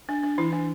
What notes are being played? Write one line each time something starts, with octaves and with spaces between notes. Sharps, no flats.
D4
D4
E3 E4
D4